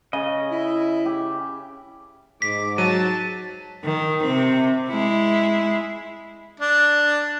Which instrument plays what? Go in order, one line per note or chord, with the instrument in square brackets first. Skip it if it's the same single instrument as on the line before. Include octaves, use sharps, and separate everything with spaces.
[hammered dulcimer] C#3 [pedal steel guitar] D#5
[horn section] E4
[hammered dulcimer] G4
[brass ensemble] G#2 [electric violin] D6 [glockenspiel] B6
[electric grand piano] F#3 [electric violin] A5 A6 [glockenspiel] D#7
[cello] D#3
C3 C4
G#3 E4
[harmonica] D4